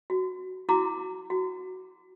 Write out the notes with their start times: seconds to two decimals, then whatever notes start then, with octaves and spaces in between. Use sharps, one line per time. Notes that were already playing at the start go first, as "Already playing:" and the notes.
0.10 F#4
0.69 E4 F#4 A#5 D6
1.30 F#4